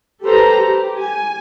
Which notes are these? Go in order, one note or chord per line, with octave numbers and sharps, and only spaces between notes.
G4 A4 B4 C5 A#5
G4
G#5